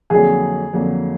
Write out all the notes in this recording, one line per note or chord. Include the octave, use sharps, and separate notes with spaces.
F2 D3 F#3 A#3 G#4
F2 D3 F#3 A#3